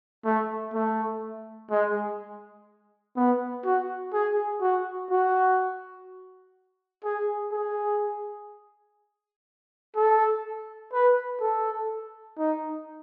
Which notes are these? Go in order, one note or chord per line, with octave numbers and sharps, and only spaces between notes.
A3
A3
G#3
B3
F#4
G#4
F#4
F#4
G#4
G#4
A4
B4
A4
D#4